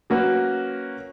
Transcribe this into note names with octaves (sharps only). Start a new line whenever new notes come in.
F#3 A#3 C#4 F#4 B4